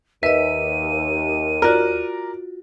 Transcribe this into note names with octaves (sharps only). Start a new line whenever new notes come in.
D#2 B4 D#5 E5 D#7
F4 F#4 A#4 D5